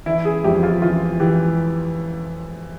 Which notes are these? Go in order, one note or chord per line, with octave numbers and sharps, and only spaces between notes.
E3 E4
G#4
F2 G4
F4
E3 F4
E3 G4